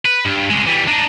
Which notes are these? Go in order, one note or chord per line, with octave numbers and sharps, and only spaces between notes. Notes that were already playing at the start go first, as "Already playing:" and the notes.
B4
G2
C2 G#3
E3 G3
D4 D#4